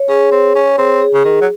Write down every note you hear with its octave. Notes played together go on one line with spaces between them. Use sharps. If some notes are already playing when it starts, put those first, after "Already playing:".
Already playing: C#5
C#4 G#4
C4 C#5
C#4 C#5
C4 G#4
G#4
C#3
D#3 G#4
F#3